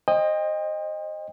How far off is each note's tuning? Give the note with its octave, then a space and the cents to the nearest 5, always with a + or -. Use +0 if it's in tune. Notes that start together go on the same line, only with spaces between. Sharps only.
C5 +20 D#5 -10 G5 +35